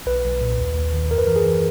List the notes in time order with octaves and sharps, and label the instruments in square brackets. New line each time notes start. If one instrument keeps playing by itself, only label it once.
[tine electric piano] B1 B4
B1
A#2
D#2
D#2
D#3
F#2 A#4
B4
E3 A#4
G#4
E3